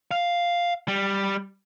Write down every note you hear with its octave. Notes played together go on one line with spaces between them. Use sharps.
F5
G3